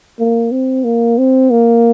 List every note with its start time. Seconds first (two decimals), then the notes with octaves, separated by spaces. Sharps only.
0.19 A#3
0.51 C4
0.84 A#3
1.18 C4
1.51 A#3